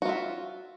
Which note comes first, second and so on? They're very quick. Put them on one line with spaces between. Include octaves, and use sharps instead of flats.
F#4 F4 E5